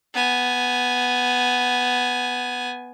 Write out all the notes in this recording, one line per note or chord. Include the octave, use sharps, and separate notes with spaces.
B3 G#5